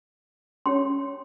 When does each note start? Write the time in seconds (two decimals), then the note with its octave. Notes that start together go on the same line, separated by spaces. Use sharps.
0.66 C#4 G4 C#5 C6